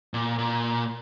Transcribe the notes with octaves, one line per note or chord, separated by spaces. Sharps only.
A#2
A#2